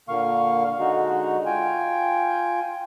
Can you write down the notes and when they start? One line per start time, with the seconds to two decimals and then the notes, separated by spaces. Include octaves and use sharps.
0.09 A#2 D3 A#3 F5 C#6
0.79 D3 G#3 D#4 F#4
1.46 F4 G5 G#5